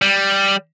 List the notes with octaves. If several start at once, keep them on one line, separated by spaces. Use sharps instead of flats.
G3